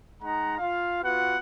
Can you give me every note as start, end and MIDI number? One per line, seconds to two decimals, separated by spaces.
0.21 0.56 56
0.21 0.56 63
0.21 0.56 78
0.21 0.56 82
0.58 1.01 65
0.58 1.01 77
1.03 1.36 59
1.03 1.36 65
1.03 1.36 66
1.03 1.36 71
1.03 1.36 78